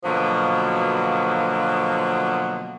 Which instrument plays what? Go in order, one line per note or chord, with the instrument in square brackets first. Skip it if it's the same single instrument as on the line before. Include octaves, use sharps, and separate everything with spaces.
[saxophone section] B2 D3 F3 F#3 A#3 B3